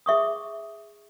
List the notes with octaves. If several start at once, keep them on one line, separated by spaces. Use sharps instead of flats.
G#4 E5 C#6 D#6